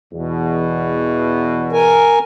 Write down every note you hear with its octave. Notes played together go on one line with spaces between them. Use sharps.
E2 B2
A#4 G#5